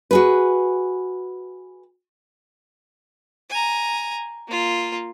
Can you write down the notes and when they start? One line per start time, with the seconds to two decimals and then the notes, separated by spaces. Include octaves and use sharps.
0.11 F#4 G#4 B4
3.50 G#5 A#5
4.48 A#3 F4